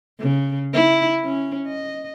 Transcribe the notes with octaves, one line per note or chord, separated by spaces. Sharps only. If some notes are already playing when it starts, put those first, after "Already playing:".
C#3
E4
C#4
D#5